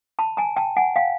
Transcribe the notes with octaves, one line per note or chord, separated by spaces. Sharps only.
A5 B5
G#5 A#5
G5 A5
F#5 G#5
F5 G5